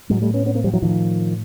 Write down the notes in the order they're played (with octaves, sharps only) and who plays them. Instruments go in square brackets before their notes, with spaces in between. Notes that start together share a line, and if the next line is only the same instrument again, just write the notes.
[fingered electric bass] A2 F#3 G#3
G3 A3
B3 C#4
B3 C#4
A#3 C4
F3 G3
E3 F#3
A2 D#3 F3